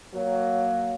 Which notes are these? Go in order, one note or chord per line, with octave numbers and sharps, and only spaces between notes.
F#3 A#3